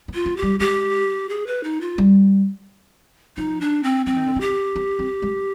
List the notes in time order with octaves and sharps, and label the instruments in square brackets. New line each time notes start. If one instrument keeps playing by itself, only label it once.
[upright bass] B3
[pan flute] F4
[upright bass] B3
[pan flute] G4
[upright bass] G3
[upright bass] G#3 [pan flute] G4
[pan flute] G#4
B4
D#4
F4
[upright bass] G3
[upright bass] F3 [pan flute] D#4
[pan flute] D4
C4
[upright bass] F3 [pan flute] C4
[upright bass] D#3
D3
[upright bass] D#3 [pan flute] G4
[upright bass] C4
C4
G#3